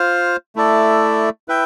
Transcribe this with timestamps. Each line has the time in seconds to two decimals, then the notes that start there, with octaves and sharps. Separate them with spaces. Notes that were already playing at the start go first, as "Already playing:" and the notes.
Already playing: F4 C5 F5
0.56 A3 E4 A4 D5
1.48 E4 B4 E5 G5